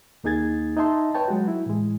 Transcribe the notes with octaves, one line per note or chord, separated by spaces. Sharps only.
D#2 A#3 D#4 G#4 G#6 A6
D#4 D#5 E5 A5 C6
B4 C#5 G5 A5
F#3 G#3 F#4
E4
A2 E3 G#3